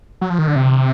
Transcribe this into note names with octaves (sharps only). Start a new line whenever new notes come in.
F#3
F3
D#3
D3
C3